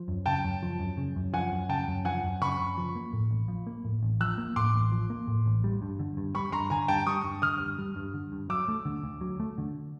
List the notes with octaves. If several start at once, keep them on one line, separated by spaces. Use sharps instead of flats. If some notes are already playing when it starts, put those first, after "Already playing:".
Already playing: F3
F#2
C#3 G5 A5
F#2
F3
F#2
C#3
F#2
F3 F#5 G#5
F#2
C#3 G5 A5
F#2
F3 F#5 G#5
F#2
C#3 B5 C#6
F#2
F3
A#3
A2
A1
F3
A#3
A2
A1
F3 E6 F#6
A#3
A2 C6 D6
A1
F3
A#3
A2
A1
G3
G2
D3
G2
G3 B5 C#6
G2 A#5 C6
D3 G#5 A#5
G2 G5 A5
G3 C#6 D#6
G2
D3 D#6 F6
G2
G3
G2
D3
G2
F#3 D6 E6
A3
D3
D2
F#3
A3
D3